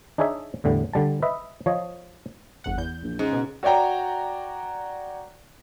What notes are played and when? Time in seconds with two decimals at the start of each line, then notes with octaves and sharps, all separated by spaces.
0.18 D4 D#4 G#4 C#5 E5
0.64 E2 A2 D3 G3
0.93 D3 G3 A5
1.22 B4 D#5 E5
1.66 F3 C#5 D#5
2.64 G1 E2 F#5
2.78 E2 G6
3.02 A#1
3.19 G#2 C#3
3.33 B2
3.63 F#4 C#5 D5 G5 A#5